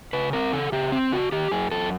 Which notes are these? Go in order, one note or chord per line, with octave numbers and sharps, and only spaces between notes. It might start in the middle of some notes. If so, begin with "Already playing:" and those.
C#3 B4
C4 A#4
C#3 A4
C#3 G4
C4
C#3 F#4
D#3 G4
F#2 G#4
F#2 A4